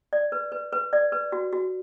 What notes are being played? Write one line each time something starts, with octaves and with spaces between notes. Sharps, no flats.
D5
B4
B4
B4
D5
B4
F#4
F#4